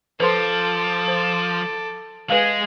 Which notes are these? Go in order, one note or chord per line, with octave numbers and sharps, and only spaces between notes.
F3 A4 B4 C5 C6 D6
C5
G#3 G#4 B4 F5